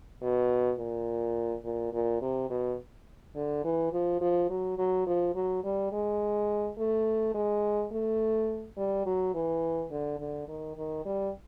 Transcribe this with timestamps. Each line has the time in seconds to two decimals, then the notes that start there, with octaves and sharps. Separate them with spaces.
0.22 B2
0.79 A#2
1.64 A#2
1.93 A#2
2.21 C3
2.50 B2
3.35 D3
3.64 E3
3.93 F3
4.21 F3
4.50 F#3
4.78 F#3
5.07 F3
5.35 F#3
5.64 G3
5.92 G#3
6.78 A3
7.34 G#3
7.92 A3
8.77 G3
9.05 F#3
9.34 E3
9.91 D3
10.19 D3
10.48 D#3
10.77 D#3
11.05 G3